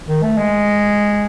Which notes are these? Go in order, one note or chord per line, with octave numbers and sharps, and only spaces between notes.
D#3
A3
G#3